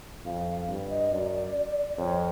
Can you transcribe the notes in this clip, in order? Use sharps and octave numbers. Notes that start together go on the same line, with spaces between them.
F2 F5
F5
G2
D#5
F#2 D5
F2 C#5